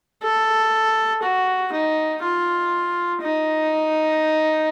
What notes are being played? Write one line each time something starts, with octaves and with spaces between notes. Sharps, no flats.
A4
F#4
D#4
F4
D#4